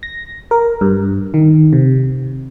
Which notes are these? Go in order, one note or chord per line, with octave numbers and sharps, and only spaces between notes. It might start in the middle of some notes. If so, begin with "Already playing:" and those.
A#6
A#4
G2
D#3
C3